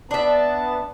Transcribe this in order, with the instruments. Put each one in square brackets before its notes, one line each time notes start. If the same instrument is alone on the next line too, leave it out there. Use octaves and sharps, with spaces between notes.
[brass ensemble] B3 A5 [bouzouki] D4 E5